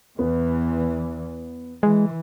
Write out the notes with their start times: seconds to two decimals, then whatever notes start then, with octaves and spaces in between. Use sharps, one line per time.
0.19 E2 E3 B3
1.83 E3 G#3